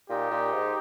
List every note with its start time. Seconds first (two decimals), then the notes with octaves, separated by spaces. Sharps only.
0.09 A#2 D#4 G4
0.31 A#2
0.53 G#2